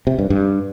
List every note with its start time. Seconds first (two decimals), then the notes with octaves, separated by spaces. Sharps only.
0.07 C3
0.19 G2
0.30 G2